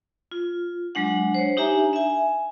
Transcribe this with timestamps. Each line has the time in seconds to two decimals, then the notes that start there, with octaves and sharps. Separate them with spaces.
0.31 F4
0.95 F#3 G#3 D4 F#5
1.34 C5 C#5
1.57 D4 D#4 G4 E5 G#5 A#5
1.93 E5 G#5